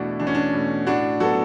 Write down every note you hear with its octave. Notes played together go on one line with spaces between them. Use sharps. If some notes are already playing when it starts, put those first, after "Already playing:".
Already playing: E2 B2 A3 D4 E4 F#4
E2 D4
C#4
D4
B2 A3
A2 D4 F#4
F#3 B3 F#4 A4